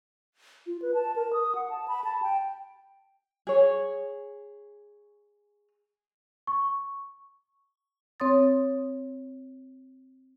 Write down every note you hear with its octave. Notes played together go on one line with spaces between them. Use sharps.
F4
B4
A5
A#4
D#6
F#5
A5
B5
A5
G5
G#4 C#5
C#6
C4 C#5 C6 D#6 A6